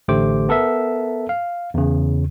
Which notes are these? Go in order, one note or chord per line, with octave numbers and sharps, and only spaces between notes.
A1 D3 A3 G4 C5 D6
B3 A4 A#4 E5
F5
E2 C#3